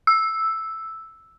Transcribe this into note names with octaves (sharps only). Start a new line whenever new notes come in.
E6